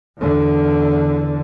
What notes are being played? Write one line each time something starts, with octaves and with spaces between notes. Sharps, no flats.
E2 D3